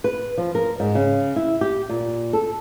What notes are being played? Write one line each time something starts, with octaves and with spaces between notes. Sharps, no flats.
B4
F3
A#4
G#2
C#3
E4
G4
A#2
A4